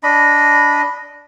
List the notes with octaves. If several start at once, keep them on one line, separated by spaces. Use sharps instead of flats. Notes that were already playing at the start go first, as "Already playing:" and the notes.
D4 D#5 B5